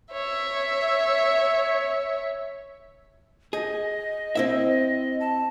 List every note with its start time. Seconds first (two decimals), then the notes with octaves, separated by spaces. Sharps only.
0.11 C#5 E5
3.53 G#4 D#5
4.35 C4 E4 E5
5.20 A5